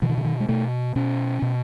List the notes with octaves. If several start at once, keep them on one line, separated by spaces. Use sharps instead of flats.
B2 E3
D#3
D3
D#3
G#3
B2 A3
B2 C#4
B2